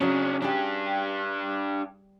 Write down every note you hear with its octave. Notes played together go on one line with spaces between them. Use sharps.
C#3 F#3 C#4 D4
G3 D4 G4 G#4 F#5